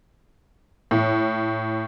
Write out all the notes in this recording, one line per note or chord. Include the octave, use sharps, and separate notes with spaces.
A2